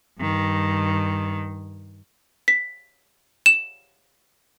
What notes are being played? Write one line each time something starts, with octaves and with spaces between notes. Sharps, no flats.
G2 D#3
B6
E7